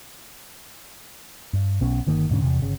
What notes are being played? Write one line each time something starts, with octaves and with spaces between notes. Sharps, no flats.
G2
B1 B3 C#4
G1 D#3 A#3
E1 G#2 D3 C#4
E2 G#2 C3
G1 C#3